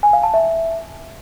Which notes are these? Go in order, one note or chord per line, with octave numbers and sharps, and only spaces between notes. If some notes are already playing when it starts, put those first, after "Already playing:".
G#5
F5
A5
E5